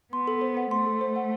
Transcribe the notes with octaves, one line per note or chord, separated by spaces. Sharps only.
B3 C6
A4
C5
F#5
A3 C6
A4
C5
F#5